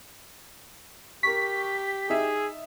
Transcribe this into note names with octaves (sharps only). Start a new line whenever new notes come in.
G4 A#4 C#6 B6
D#4 G#4 E5